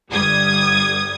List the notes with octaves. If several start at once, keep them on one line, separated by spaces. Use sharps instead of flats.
G1 G3 D#6 G#6